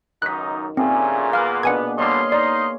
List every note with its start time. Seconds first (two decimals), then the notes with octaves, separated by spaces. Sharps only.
0.22 C#2 F#2 D#3 D#4 F#6 B6
0.77 G2 A#2 A3 C4 C#4 G#4 G#5
1.33 A#3 B3 F5 F6
1.63 B2 A#3 B3 D4 F#5 G#5 G#6
1.98 B2 D3 G3 C#5 D#5 F5 A#5 C6
2.32 D#4 D5